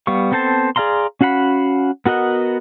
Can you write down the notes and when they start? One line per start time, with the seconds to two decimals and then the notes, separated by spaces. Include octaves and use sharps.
0.07 G3 B3 F5 C#6
0.32 B3 C4 A4 C5 A5
0.76 G#4 D5 F5 A#5 C6
1.21 C#4 F#4 F5 F#5 B5
2.06 B3 F#4 A#4 D#5 F#5